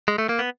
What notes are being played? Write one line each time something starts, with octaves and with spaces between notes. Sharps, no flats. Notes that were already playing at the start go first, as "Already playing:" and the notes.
G#3
A3
A#3
B3